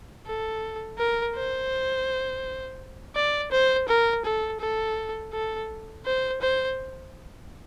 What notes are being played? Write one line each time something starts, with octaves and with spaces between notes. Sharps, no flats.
A4
A#4
C5
D5
C5
A#4
A4
A4
A4
C5
C5